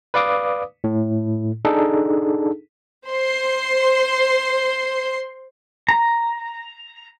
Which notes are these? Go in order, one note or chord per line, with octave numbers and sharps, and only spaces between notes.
B4 D5 F5 D6 D#6
A2
D4 D#4 G#4 A4
C5 C6
A#5